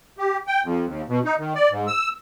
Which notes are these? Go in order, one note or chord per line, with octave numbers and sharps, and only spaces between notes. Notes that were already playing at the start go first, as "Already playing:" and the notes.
G4
G5
F2
D#2
B2
D#4
D#3
D5
G#2
E6